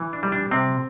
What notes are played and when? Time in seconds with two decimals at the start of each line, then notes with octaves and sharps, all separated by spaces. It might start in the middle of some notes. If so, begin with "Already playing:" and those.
Already playing: E3
0.13 D4
0.23 G3
0.32 D4
0.51 C3 C4